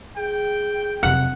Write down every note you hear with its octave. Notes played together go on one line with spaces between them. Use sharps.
G#4 G5
F1 F#2 C3 F#5